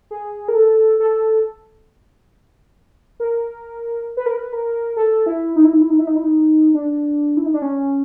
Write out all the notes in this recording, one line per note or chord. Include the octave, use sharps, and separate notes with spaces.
G#4
A#4
A4
A4
A#4
B4
A#4
B4
A#4
A4
E4
D#4
E4
D#4
E4
D#4
E4
D#4
E4
D#4
D4
E4
D#4
D4
C#4